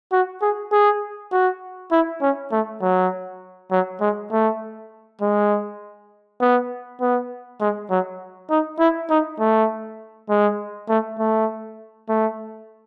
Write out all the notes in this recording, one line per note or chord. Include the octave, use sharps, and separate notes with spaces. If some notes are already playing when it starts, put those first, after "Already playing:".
F#4
G#4
G#4
F#4
E4
C#4
A3
F#3
F#3
G#3
A3
G#3
B3
B3
G#3
F#3
D#4
E4
D#4
A3
G#3
A3
A3
A3